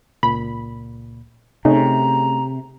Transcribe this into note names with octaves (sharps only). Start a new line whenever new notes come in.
C#2 A#2 B5
C3 A3 C#4 D#4 G#4 A#5